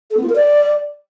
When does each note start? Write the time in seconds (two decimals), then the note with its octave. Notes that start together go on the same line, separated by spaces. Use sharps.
0.11 A4
0.17 B3
0.23 F4
0.29 A#4
0.35 D5